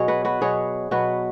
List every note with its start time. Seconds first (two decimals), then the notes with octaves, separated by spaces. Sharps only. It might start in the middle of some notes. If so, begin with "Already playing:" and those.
Already playing: B2 F#3 G#4 C#5
0.08 F#4 B4
0.25 F#4 B4
0.41 B2 F#3 G#4 C#5
0.91 B2 F#3 F#4 B4